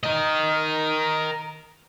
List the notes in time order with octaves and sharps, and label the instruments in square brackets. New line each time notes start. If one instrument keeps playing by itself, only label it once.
[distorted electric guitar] A#4 D#5